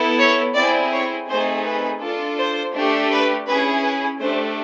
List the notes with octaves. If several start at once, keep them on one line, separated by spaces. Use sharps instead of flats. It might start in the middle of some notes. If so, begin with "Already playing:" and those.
Already playing: B3 E4 A4
C#5
C4 E4 G#4 D5
C#5
A3 C4 D#4 G#4 C5
B4
D4 F4 A4
C5
A3 D4 G4
B4
C#4 E4 G#4 B4
B4
A3 D4 G4 C5